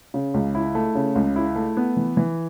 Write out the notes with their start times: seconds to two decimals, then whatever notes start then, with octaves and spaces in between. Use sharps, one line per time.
0.14 C#3
0.34 C#2
0.55 E4
0.75 A3
0.95 C#3
1.15 C#2
1.36 E4
1.56 A3
1.77 B3
1.97 E3
2.17 E3